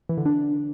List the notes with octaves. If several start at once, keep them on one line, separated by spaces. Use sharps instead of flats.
E3
D3
D4